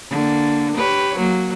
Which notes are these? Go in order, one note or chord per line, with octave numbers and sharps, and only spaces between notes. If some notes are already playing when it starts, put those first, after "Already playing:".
D3 A#3
G4 B4 C#5
F#3 A#3